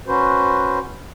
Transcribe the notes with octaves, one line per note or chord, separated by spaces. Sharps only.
C#4 F#4 B4 C5